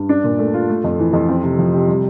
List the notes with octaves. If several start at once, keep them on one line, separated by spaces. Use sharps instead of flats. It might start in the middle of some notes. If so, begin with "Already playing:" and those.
Already playing: G2
D4
A#2
A3
F4
A3
F2
E3
F2
C4
C3
F3
C3
G3